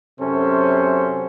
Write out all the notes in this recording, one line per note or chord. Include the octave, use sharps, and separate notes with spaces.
F#2 C3 C#4 A4 C5